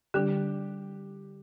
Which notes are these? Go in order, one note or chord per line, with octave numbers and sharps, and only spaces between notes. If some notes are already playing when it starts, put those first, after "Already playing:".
D3 G3 D4 G4